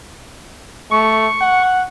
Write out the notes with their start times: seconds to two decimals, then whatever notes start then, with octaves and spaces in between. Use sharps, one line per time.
0.91 A3 C#6
1.41 F#5